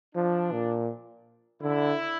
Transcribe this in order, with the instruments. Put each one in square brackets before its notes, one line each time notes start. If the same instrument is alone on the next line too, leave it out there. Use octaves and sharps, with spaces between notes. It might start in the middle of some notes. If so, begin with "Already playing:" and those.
[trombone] F3 [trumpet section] D4
[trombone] A#2
[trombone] D3 [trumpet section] E4